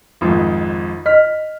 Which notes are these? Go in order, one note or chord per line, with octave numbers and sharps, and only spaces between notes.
G#1 F2 G#2
D#5 F6 B6